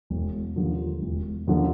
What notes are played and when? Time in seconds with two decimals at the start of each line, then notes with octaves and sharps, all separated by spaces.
0.10 E1
0.56 D#2 D3 F3
1.02 E1
1.47 D#2 D3 F3